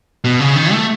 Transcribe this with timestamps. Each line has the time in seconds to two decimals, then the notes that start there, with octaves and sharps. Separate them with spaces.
0.24 B2
0.40 C#3
0.56 D#3
0.72 A3